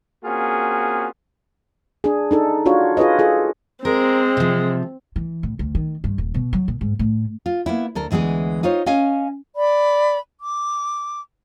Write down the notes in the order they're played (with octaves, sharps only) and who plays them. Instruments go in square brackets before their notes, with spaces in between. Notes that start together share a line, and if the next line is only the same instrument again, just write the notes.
[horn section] A#3 C4 C#4 F4 F#4 G#4
[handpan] D4 G#4
D4 D#4 A4
D4 F4 F#4 C#5
F4 G#4 B4 C#5 D#5
F4 G#4 A4
[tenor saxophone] G#3 [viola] C4 [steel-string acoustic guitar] A#4
[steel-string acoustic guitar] C3 F3
[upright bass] E3
A2
D2
D#3
G2
D#1
B2
F#3
A#2
G#2
A2
[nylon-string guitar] F4
A#3 B3 E4
D2 A4 A#4
D2 E3 G#3 B3 G#4
D#4 F4 C5 C#5
C#4 D#5 F5 G#5
[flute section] D5 B5
D6